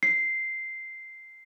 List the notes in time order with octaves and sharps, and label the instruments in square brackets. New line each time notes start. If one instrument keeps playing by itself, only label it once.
[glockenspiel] C7